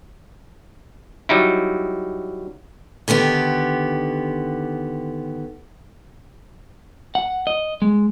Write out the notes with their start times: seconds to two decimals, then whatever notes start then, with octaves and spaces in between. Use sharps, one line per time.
1.29 F#3 G3 D#4 E4
3.08 D3 D#3 B3 G4
7.15 F#5
7.47 D#5
7.82 G#3